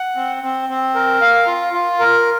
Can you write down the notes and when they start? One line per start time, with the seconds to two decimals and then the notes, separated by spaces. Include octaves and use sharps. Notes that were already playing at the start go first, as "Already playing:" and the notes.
Already playing: F#5
0.16 C4
0.43 C4
0.69 C4
0.95 A#4
1.21 F5
1.47 F4
1.73 F4
1.99 A#4